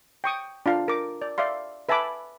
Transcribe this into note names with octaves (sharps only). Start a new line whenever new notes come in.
G5 C#6 D#6
D4 F4 F5
A#4 D6
D5
D5 E5 F5 C6
B4 E5 G#5 A5 B5 D6